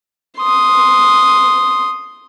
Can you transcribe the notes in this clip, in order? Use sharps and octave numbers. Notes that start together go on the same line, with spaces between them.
C6 D#6